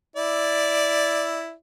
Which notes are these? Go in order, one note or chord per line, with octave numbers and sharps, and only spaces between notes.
E4 D5